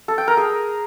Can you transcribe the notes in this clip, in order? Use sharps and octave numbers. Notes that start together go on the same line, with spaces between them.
A4
G5
A#4
G#4